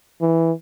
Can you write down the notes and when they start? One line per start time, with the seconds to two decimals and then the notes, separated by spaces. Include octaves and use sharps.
0.21 E3